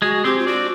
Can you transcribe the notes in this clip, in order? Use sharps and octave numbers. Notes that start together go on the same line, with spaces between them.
G#3 F#4 G#4
C4 G4 C5
F4
D4 F#4 D5